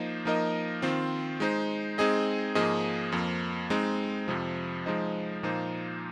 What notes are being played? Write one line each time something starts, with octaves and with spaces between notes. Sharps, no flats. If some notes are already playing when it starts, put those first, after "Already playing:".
Already playing: F3 A#3 D#4 C5 D#5
F3 A#3 D#4 A#4 D#5
D#3 C4 F4 C5
G#3 D#4 C5
G#3 C4 D#4 G#4 D#5
G#2 F3 A#3 G#4 D#5
F2 F3 A#3
G#3 C4 D#4
F2 C3 F3
F3 G#3 D#4 C5 D#5
A#2 F3 A#3 D#4 C5